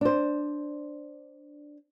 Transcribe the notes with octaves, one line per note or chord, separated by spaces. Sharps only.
D4 C5